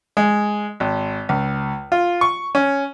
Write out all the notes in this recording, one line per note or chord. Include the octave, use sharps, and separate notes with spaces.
G#3
G#1
C#2
F4
C#6
C#4